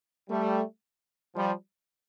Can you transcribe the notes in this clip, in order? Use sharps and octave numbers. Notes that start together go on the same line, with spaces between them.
G3 A3
F3 G3